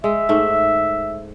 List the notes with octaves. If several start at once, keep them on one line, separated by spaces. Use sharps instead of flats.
G#3 E5
G#2 A3